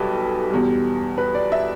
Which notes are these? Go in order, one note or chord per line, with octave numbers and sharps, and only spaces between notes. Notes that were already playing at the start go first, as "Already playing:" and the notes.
Already playing: B1 B2 G3 G4 A4 B4
E2 B2 G3
B4
D5
E5